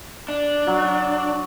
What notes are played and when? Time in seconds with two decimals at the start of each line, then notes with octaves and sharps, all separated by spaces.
0.28 D4
0.67 F#3